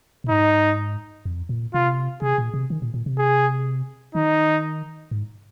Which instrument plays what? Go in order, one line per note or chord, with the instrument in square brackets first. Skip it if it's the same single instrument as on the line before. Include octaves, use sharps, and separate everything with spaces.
[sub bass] A#2
[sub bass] G#2 [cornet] D#4
[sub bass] F2
A#2
[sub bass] C3 [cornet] F4
[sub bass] C3 [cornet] G#4
[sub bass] A#2
C3
D#3
A#2
A#2
C3
[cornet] G#4
[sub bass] D#3 [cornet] D#4
[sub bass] G#2